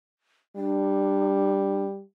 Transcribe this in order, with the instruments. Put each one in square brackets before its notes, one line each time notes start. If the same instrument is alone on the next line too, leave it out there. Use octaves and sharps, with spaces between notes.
[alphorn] G3 [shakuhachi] D4